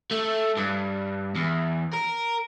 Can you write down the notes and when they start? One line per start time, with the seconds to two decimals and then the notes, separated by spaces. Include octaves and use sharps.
0.11 A3
0.57 G2
1.35 E2
1.93 A#4